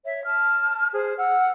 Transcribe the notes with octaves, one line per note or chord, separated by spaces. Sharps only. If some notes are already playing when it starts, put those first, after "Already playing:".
C#5 E5
A5 F6
G#4 C5
F#5 E6 F6